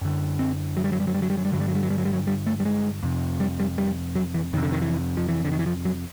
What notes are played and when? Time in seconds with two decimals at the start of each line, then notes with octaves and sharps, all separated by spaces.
0.01 F#2 D3
0.39 C4
0.77 F#3
0.84 G3
0.92 F#3
1.00 G3
1.07 F#3
1.14 G3
1.22 F#3
1.30 G3
1.37 F#3
1.45 G3
1.52 G2 D3 F#3
1.60 G3
1.68 F#3
1.75 G3
1.83 F#3
1.90 G3
1.98 F#3
2.05 G3
2.13 F#3
2.27 G3
2.47 A3
2.60 G3
2.65 G#3
3.03 F2 C3
3.40 G3
3.60 G3
3.78 G3
4.15 F#3
4.34 E3
4.53 F2 D#3
4.57 C3
4.63 D3
4.72 D#3
4.82 E3
5.17 F3
5.29 E3
5.45 D3
5.52 D#3
5.59 E3
5.66 F3
5.85 F#3